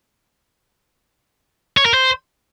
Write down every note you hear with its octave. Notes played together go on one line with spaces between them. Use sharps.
C#5
A#4
C5